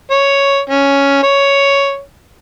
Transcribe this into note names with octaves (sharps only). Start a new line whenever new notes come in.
C#5
C#4
C#5